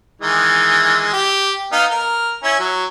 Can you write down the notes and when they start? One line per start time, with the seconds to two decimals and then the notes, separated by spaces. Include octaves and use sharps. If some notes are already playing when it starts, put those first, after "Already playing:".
0.21 D#3 E3 G#3
1.13 G4
1.72 B3 D#4 F5
1.90 A#4
2.43 C#4 E4
2.60 F#3